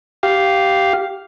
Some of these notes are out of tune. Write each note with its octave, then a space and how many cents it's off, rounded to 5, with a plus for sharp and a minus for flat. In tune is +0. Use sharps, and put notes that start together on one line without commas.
G4 -10 F5 +0